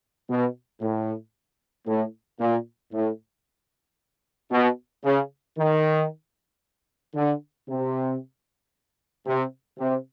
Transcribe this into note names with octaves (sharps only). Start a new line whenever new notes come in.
B2
A2
A2
A#2
A2
B2
C#3
D#3
D3
C3
C3
C3